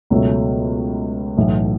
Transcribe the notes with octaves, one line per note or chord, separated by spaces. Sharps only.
C#2 B2 F#3 A3
B1 A2 E3